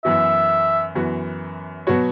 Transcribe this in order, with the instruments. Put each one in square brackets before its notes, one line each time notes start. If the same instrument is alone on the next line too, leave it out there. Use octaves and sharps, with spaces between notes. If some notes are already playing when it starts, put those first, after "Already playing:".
[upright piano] F#2 E3 B3 F#4 [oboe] E5
[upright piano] F#2 E3 B3 F#4
B2 F#3 B3 F#4 C#5